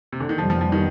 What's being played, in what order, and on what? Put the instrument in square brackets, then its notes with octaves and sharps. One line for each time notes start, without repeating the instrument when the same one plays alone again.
[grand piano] C3
D3
D#3
[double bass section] F2 C3 G3 B3 [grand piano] F3
[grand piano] F3
F3
D#3